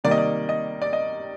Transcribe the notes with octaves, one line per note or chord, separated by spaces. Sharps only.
C3 D#3 G3 A#3 D5
D#5
D5
D#5
D5
D#5